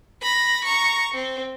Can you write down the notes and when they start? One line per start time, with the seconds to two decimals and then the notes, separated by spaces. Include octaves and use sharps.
0.22 B5 A#6
0.65 A#5 C#6
1.14 C4